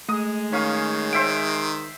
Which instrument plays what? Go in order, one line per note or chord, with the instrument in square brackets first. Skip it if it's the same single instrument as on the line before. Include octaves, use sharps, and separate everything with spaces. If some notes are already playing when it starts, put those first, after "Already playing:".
[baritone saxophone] G#3 [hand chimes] A3 [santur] D#6
[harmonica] D#3 [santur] C#4 F5 G#5
[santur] C5 E5 G5 [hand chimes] D7